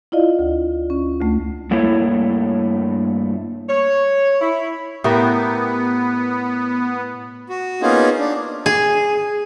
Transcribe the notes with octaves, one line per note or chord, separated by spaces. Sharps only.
E4 F4 D5 D#5 F5
D2
C#4
D2 A3
G2 A3 A#3 E4 C#5
C#5
E4
A2 B3 G4 A#4
F#4
A#3 B3 C#4 D#4 F4 G#4
D4
G#4